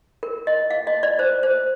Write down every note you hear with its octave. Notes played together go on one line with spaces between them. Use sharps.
A#4
D#5
F5
D#5
D5
C5
C5